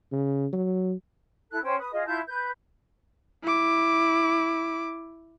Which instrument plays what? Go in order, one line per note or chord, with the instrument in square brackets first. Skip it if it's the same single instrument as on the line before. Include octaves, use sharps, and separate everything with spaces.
[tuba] C#3
F#3
[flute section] E4 A4 F#6
C#4 C5 G5
B4 D#6
F4 G#4 D#5
E4 F4 A5 G6
B4 G6
[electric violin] E4 D6